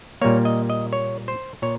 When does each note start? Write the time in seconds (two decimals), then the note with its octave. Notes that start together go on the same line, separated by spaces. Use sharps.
0.21 A#2 G3 A#3 C#5
0.45 D#5
0.70 D#5
0.93 C#5
1.28 C5
1.62 A#2 C#5